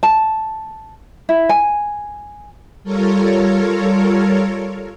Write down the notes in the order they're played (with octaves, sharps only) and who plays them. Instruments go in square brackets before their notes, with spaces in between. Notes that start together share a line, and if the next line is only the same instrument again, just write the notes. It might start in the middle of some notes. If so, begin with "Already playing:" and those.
[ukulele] A5
E4
G#5
[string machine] G3 F4 A4 A#4 C#5